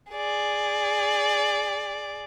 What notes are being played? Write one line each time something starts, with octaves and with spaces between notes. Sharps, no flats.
G#4 D5